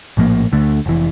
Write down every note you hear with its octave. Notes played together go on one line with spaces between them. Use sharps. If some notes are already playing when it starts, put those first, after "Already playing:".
A#1 A2 F3 A#3
D2 D3 A3
F1 E3